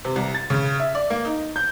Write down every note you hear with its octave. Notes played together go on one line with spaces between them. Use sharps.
C3
C2
A6
C#3
E5
D5
A#3
D#4
G6